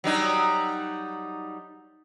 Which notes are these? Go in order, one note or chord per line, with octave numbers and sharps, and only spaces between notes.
F#3 G3 D#4